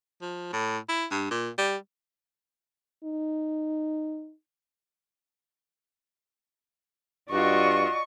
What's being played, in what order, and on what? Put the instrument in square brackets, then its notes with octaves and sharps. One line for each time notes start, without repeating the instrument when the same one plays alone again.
[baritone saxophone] F3
A2
E4
G2
A#2
G3
[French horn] D#4
[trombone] G2 [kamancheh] F4 F#4 [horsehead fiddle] D5 D#5 [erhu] C#6